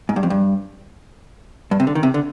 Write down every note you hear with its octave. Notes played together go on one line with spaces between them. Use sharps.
G#2
G2
F2
G2
G2
C3
D3
D#3
C3
D3